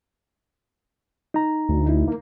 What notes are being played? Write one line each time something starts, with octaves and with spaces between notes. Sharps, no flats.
D#4 A#5
D2
D#4 E4
A#3